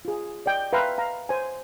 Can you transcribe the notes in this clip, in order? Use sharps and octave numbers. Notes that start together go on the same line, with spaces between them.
F4 G#4
D5 D#5 G5
B4 E5 F5 G5 A#5 C6
F5 A#5
C5 G#5